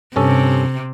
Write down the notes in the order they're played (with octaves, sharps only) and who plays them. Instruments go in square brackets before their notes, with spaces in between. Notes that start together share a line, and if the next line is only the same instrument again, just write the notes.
[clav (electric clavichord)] G2 C#4 A4 [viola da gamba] C3